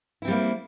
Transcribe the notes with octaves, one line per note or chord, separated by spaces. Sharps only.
G3 A#3 C4 E4